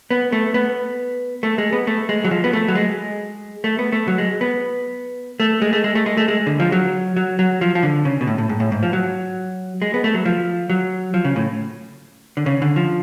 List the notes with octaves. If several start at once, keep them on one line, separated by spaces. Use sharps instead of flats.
B3
A3
B3
A3
G#3
B3
A3
G#3
F#3
F3
B3
A3
F#3
G#3
A3
B3
A3
F#3
G#3
B3
A3
G#3
A3
G#3
A3
G#3
A3
G#3
D3
F3
F#3
F#3
F#3
F3
F3
D3
C#3
B2
A2
A2
G#2
A2
G#2
F3
F#3
G#3
B3
A3
F#3
F3
F#3
F3
C#3
A2
D3
C#3
D3
F3